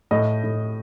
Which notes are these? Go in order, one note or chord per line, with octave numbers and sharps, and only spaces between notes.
A2 D#5
A2